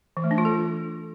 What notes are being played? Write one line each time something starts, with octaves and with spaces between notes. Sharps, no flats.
E3
A3
D4
F4
A4